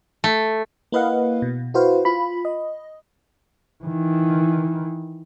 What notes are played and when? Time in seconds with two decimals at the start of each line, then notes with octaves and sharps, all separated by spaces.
0.24 A3
0.92 A#3 E4 B4 D#5 F5 F#5
1.42 B2
1.74 E4 F#4 B4 C5 F5
2.05 F4 B5
2.45 D#5
3.84 D#3 E3